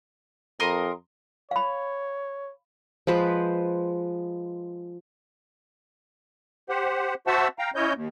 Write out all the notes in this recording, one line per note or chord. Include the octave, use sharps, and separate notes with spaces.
F2 A#4 C6 D#6
C#5 F5 B5
F3 G#3 B4 C5
G4 C5 F#5
F#4 C5 E5 F#5 A5 E6
F5 G5 A#5
C#4 E4 C#5 D#5 G6
D#2